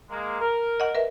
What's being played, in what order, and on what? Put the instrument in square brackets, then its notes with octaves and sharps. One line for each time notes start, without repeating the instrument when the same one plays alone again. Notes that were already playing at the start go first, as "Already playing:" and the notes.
[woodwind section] G#3 A#3
A#4
[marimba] D#5 F#5
A#4 B4 E5